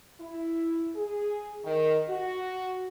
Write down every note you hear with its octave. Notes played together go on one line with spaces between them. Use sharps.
E4
G#4
D#3
F#4